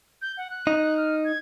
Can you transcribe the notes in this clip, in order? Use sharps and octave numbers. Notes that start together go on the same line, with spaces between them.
G6
F#5
F#6
D#4
F6
G#6